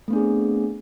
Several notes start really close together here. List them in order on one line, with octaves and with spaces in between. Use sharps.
A3 B3 D4 G#4 C4